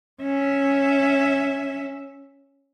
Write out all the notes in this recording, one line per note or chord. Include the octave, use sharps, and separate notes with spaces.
C#4 E5